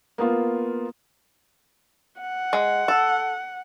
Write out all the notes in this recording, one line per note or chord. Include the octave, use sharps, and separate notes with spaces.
A#3 B3 F4
F#5
G#3
A4